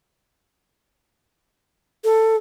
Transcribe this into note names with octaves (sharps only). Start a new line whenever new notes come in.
A4